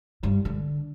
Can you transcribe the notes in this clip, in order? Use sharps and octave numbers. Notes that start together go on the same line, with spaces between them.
G2
D3